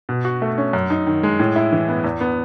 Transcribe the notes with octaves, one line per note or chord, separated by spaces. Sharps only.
B2
F#4
A3
C#4
F#2
D#4
D#3
G#3
A2
E4
E3
B3
E2
B3